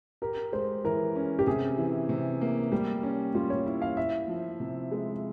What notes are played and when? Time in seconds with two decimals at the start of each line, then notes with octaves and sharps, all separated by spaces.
0.22 G4 A#4
0.52 G#3 C5
0.84 E3 A#4
1.15 C#4
1.39 G4
1.47 C3 G#4
1.78 E3
2.09 C3
2.41 A#3
2.72 G3 G4
3.03 C#4
3.35 G3 F4
3.50 C#5
3.66 E4
3.82 F5
3.97 E4 E5
4.28 F3
4.60 C3
4.92 G#3